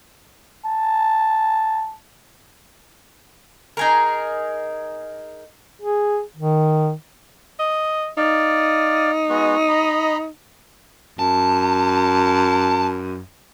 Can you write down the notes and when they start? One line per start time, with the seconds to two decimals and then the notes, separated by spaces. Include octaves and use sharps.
0.66 A5
3.77 D#4 G#4 A#4
5.80 G#4
6.37 D#3
7.59 D#5
8.18 D#4 D5 F5
9.30 G#3 B3 F#4
9.69 D#5 A#5 B5
11.19 F#2 A5